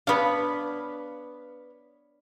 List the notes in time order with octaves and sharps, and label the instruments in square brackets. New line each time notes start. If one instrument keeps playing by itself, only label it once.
[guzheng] B3 D4 [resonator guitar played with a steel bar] B4 C#5 F5